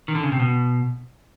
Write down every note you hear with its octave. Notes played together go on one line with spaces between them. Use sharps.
D#3
D3
C#3
C3
B2